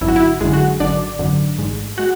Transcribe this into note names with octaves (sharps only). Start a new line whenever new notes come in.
G#1 F#2 D3 E4
F#4
E4
G#1 F#2 D3 G#3 G#4
F#4
G#1 F#2 D3 D4 D5
G#1 F#2 D3
A1 G#2 G#3
G#3 F#4 F#5